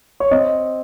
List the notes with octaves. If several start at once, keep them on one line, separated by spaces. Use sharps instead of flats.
C#5
C4 D#5